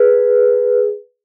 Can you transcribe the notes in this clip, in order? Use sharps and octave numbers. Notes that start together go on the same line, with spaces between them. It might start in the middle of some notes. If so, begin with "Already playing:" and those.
Already playing: G#4 B4